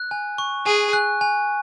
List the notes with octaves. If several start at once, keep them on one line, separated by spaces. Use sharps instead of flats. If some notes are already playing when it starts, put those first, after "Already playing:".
Already playing: F#6
G#5
C#6
G#4 G#5
F#6
G#5